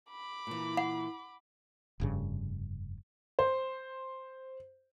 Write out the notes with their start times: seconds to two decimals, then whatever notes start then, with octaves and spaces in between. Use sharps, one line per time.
0.10 B5 D6
0.47 A#2 E3
0.77 F#5
2.00 F1 G2 C#3
3.39 C5